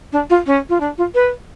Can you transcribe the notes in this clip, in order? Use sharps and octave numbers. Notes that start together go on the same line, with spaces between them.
D4
F4
C#4
F4
D4
F4
B4